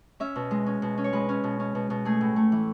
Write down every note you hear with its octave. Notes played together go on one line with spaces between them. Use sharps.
C#4 E5
B2
G#3
C#4
B2
C#4
C#5
G#3 B4
C#4
B2
C#4
B2
B2
A3 G#4
A2
A3
E3